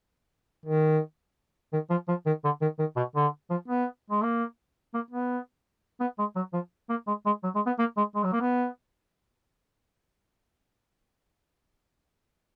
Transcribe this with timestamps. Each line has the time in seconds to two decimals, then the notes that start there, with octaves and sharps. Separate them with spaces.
0.66 D#3
1.73 D#3
1.90 F3
2.08 F3
2.26 D#3
2.44 D3
2.61 D#3
2.79 D#3
2.97 B2
3.16 D3
3.50 F3
3.68 B3
4.10 G#3
4.22 A#3
4.94 A#3
5.11 B3
6.01 B3
6.19 G#3
6.36 F#3
6.53 F3
6.90 A#3
7.07 G#3
7.26 G#3
7.44 F#3
7.55 G#3
7.66 B3
7.79 A#3
7.97 G#3
8.15 G#3
8.24 F#3
8.33 A#3
8.41 B3